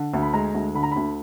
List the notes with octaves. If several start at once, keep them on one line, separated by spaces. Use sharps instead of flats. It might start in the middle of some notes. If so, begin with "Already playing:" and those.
Already playing: D3
D2
B5
G#3 A#5
D2
D3 B5
A#5
D2 B5